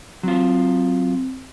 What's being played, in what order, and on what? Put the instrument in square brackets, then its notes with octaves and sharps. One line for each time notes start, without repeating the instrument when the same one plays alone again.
[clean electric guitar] F#3 F4 [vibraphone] C4